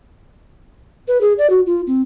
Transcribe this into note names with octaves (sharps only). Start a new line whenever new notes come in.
B4
G#4
D5
F#4
F4
C4